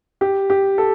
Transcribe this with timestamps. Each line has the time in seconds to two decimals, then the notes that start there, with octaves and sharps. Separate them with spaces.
0.21 G4
0.50 G4
0.78 A4